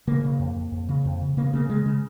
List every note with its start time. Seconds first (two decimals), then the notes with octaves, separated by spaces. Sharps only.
0.07 C#3 A#3
0.24 C#3
0.39 F2
0.56 F2
0.72 F2
0.89 C#3
1.05 F2
1.21 C#3
1.37 C#3 A#3
1.46 B3
1.53 C#3 A#3
1.69 C#3 G#3
1.86 C#3